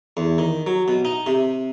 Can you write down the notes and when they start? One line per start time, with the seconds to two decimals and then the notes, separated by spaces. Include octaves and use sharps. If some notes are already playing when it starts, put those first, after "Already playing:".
0.17 E2
0.38 D#3
0.67 F#3
0.88 B2
1.05 D#4
1.26 C3